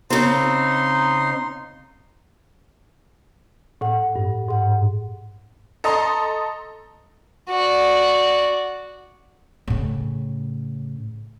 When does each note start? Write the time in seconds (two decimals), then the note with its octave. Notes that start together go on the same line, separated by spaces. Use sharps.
0.10 C#3 C4 D#4 C6
3.81 A2 F#5
4.16 G2
4.48 G#2 F#5
5.84 A4 D#5 A#5 C6
7.50 F#4 D5
9.67 A2 C#3